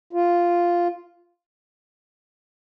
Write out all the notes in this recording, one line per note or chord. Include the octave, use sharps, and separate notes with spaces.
F4